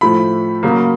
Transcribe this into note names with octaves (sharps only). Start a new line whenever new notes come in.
A2 F3 A3 B5
C#3 F#3 A#3